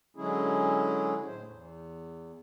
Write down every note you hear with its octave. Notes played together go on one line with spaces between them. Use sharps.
D3 F#3 G#3 C#4 E4 G#4
A2 C5
E2